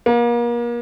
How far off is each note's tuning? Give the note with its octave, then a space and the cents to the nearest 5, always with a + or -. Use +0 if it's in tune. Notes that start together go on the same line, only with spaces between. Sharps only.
A#3 +35